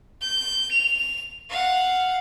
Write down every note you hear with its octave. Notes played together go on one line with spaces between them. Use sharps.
G6
F7
F5 F#5